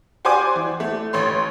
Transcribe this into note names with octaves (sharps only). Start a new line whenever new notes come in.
F#4 G4 C5 D5 G#5 D6
E3
A3
A1 C#5 C6